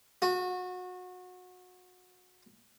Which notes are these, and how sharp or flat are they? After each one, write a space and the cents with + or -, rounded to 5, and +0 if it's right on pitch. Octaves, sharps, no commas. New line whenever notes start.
F#4 -25